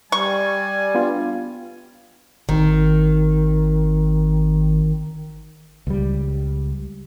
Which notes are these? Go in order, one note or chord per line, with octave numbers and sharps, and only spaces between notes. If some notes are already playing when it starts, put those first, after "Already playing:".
G3 G#5 C#6
B3 D4 F4
G#1 D#3
C#2 G3